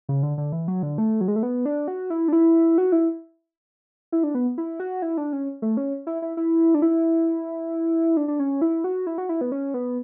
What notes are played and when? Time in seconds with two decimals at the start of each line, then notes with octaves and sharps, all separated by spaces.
0.09 C#3
0.23 D3
0.38 D3
0.52 E3
0.68 F#3
0.83 D3
0.98 A3
1.21 F#3
1.28 G#3
1.36 A3
1.43 B3
1.65 D4
1.88 F#4
2.10 E4
2.28 D4
2.33 E4
2.78 F#4
2.92 E4
4.12 E4
4.23 D4
4.35 B3
4.58 E4
4.80 F#4
5.02 E4
5.18 D4
5.33 C#4
5.62 A3
5.77 C#4
6.07 E4
6.22 E4
6.37 E4
6.74 D4
6.82 E4
8.17 D4
8.28 D4
8.39 C#4
8.62 E4
8.84 F#4
9.07 E4
9.18 F#4
9.29 E4
9.41 B3
9.52 C#4
9.74 B3